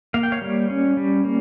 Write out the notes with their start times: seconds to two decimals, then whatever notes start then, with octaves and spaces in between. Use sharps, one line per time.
0.14 A#3 F5
0.23 G5
0.32 C#5 F5
0.41 G3
0.70 C#4
0.97 G3
1.25 A#3